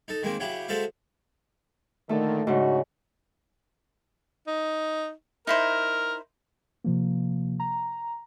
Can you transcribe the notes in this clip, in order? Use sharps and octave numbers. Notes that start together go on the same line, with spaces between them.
D#4 A4
D#3 G#3 A#3 C4
C#3 F#3 E4 G4
G#3 F#4 A4 C5 E5 F5
A#2 D3 D#3 A3 A4
G#2 C#3 D4 D#4 F#4
D#4
D#4 E4 A#4 C5
C3 F3 A#3
A#5